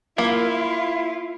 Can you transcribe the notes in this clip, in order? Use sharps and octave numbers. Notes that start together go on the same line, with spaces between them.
A#3 E4 F4